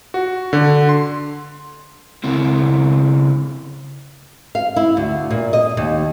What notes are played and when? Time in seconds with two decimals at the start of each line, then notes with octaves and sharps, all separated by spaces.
0.14 F#4
0.53 D3
0.89 C6
2.24 C#3 C4 E4
4.55 F5
4.76 E4
4.97 D2
5.30 A#2
5.53 D#5
5.77 D#2